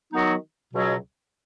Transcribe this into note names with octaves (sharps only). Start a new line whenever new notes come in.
D#3 F#3 B3 D#4 F#4
C#2 B2 F#3